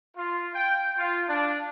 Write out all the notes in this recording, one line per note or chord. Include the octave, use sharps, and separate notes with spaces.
F4
G5
F4
D4